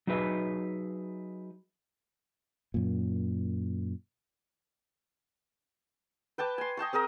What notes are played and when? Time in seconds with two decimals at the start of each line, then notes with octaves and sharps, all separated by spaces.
0.07 F#3 D#4 G#4 B4 E5
2.74 F#2 A#2
6.38 B4 G5 A5 D6
6.58 G#5 C6
6.77 D#5 G5 A5 C#6
6.93 C4 G#4 A#4 D#5